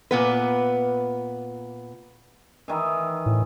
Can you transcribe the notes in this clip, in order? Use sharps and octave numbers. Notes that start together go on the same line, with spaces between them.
A#2 B3 B4
D#3 E3
A2